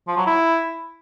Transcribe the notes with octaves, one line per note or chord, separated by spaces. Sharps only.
F3
F#3
E4